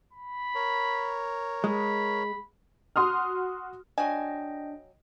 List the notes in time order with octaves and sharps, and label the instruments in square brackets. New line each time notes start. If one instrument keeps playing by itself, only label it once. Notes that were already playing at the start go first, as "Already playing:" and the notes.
[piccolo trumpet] B5
[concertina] A#4 C#5
[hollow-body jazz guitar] G#3 [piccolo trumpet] B5
[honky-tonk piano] F#4 C6 D#6 F6
[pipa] F#3 G#5 [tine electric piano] D4 [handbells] D#5 G5